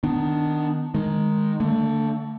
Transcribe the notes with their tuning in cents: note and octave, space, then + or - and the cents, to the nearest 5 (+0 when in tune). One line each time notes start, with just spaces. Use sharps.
D#3 -10 B3 +20 D4 +5
D#3 +0 G#3 +0
D3 +0 A3 +45